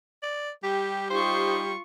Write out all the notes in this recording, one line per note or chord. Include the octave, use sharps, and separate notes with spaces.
D5
G3 G4
D#4 F4 G4 C5 C#6